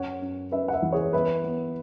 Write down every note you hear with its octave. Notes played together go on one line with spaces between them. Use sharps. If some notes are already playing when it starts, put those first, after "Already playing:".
Already playing: F#2 C#5 F#5
F#2
F#2 B4 E5
F#5
B4 E5
E3
G#4 C#5
B3 B4 E5
B3